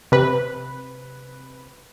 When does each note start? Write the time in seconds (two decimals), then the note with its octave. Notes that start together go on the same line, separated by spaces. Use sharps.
0.12 C3 B4